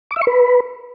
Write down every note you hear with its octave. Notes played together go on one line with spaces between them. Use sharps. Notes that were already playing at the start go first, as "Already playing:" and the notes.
D6
E5
C#6
B4